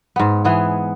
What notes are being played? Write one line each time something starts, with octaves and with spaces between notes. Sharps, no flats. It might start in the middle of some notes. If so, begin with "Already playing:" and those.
G#2 B3
E3 B3 G#4